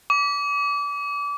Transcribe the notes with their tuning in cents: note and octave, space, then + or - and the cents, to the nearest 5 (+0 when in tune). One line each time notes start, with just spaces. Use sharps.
D6 -30